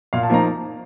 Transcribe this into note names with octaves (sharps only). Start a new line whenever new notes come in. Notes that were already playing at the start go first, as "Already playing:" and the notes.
A#2 F5
A5
F3 A#3 D#4 A#5